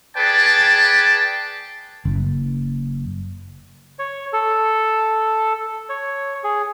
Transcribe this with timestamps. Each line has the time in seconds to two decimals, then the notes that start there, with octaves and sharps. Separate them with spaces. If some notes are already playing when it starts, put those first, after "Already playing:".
0.17 G#4 B4 D5 G5 A5
2.05 F#1
3.99 C#5
4.33 A4
5.89 C#5
6.44 G#4